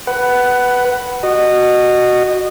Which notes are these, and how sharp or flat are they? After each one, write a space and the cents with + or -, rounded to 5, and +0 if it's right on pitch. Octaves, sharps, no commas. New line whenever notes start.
B4 +0 F#5 +15
F#4 +0 D#5 -20